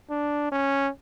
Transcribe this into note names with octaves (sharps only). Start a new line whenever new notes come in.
D4
C#4